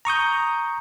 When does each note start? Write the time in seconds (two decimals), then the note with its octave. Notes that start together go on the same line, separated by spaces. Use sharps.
0.05 A#5 C#6 D#6 G6